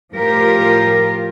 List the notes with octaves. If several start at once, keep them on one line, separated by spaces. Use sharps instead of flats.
A2 F3 F4 G4 A#4